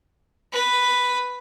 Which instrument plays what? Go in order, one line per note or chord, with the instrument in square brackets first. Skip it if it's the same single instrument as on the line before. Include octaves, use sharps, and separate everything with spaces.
[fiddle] B4